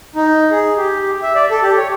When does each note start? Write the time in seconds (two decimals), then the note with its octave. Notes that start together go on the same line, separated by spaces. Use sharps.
0.15 D#4
0.51 G#4
0.77 G4
1.22 E5
1.35 D5
1.51 A4
1.62 G4
1.77 C#5